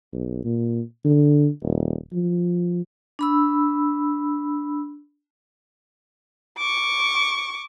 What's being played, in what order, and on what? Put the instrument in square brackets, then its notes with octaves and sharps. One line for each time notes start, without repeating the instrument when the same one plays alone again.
[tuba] B1
A#2
D3
D#1
F3
[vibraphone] D4 B5 E6
[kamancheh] C#6 D6